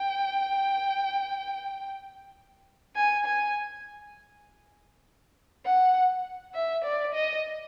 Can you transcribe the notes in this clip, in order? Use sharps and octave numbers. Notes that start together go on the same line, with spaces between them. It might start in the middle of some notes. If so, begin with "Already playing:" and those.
Already playing: G5
G#5
G#5
F#5
E5
D5
D#5